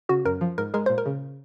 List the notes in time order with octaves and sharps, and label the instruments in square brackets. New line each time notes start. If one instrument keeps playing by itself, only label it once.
[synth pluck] C#3 [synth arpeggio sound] F#4
[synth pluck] F#2 [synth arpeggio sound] A#4
[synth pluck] F3
[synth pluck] G#2 [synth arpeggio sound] A#4
[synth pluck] G#3 [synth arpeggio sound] A#4
[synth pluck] A#2 [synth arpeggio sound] C5
[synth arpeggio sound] A#4
[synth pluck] C#3